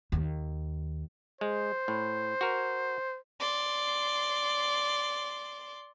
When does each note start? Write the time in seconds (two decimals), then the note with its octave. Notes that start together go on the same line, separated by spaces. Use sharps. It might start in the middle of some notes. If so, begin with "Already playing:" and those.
0.12 D#2
1.41 G#3 C5
1.88 A2
2.41 F#4 A#4
3.40 D5 C6